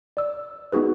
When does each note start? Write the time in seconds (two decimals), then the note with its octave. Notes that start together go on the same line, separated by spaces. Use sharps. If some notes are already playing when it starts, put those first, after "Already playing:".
0.17 D5 E6
0.72 B3 D#4 F#4 G#4 B4